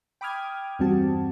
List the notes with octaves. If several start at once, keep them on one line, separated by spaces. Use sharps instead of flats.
G5 B5 D6 D#6 F6 G#6
E2 G2 G3 C4 F#4 A5